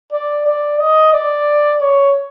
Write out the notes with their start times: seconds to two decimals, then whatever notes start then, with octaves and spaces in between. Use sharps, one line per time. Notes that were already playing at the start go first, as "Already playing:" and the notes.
0.12 D5
0.46 D5
0.79 D#5
1.13 D5
1.81 C#5